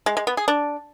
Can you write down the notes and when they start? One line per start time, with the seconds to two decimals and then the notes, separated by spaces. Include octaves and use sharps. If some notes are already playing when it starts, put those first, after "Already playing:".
0.06 G#3
0.17 G#3
0.27 B3
0.37 G#4
0.48 D4